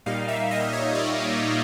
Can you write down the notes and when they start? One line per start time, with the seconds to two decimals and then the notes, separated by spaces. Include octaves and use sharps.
0.06 A#2 G3 A#3 D#4 F5
0.28 E5
0.51 D#5
0.73 C#5
0.95 D5